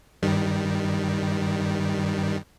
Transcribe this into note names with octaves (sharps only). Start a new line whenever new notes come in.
G2 D#3 G3